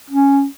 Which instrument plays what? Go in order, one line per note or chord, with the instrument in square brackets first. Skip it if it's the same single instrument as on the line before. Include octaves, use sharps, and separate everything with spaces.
[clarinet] C#4